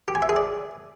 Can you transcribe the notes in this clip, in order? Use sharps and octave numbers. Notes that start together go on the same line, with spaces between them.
G4
G#5
E5
G#4
D5